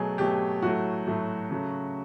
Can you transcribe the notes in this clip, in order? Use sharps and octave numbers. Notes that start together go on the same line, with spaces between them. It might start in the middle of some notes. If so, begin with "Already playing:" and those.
Already playing: B2 F#3 A3 G#4
B2 F#3 A3 G4
A2 F#3 A3 F#4
A2 F#3 A3
C#3 F#3 A3